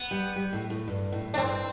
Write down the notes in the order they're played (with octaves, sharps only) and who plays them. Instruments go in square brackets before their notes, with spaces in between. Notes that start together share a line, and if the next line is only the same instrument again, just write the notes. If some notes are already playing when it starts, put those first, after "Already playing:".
Already playing: [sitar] B3
[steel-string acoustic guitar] G3
G3
A2
A2
G2
A2
[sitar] D4
[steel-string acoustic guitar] G2 [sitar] C4